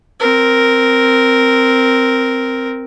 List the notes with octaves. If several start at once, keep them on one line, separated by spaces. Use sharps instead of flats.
C4 A#4